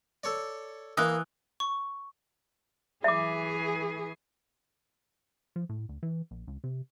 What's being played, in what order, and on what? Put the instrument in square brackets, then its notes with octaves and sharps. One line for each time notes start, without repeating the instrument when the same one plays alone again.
[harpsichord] A4 C#5 D5
[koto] E3 [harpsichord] A#3 [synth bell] D#6 F#6
[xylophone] C#6
[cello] E3 G#4 [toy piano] E5 D6
[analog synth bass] F3
A2
D2
E3
A#1
C#2
C3